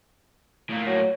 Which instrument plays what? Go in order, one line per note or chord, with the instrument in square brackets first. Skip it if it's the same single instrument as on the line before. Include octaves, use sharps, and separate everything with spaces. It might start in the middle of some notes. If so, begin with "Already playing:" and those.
[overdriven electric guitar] A2 A#3
[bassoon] F#3